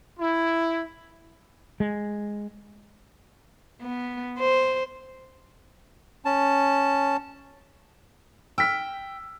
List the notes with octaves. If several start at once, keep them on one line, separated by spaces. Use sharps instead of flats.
E4
G#3
B3
C5
C#4 A5
G5 E6 F6 B6